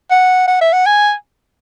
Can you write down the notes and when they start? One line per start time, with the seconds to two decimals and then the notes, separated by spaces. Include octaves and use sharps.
0.11 F#5
0.48 F#5
0.61 E5
0.73 F#5
0.86 G#5